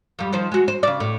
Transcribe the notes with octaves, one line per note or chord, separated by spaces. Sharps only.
F2 G3
D#3 F3 C5
G#3 F#4
C5
C#3 D5
A2